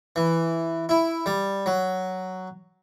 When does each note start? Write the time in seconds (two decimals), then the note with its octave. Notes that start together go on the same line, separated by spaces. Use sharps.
0.16 E3
0.89 E4
1.26 G3
1.66 F#3